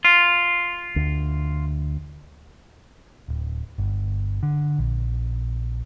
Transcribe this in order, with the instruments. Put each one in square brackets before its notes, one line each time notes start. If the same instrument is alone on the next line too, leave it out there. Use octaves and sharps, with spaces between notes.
[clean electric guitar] F4
[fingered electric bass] D2
[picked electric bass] D1
G1
D3
A#1